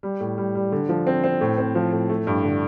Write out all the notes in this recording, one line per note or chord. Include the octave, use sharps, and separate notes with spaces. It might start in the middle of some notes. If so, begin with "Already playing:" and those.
G3
A2
G3
G3
D3
F3
C4
C4
A2
C4
F3
A2
A3
G2
D3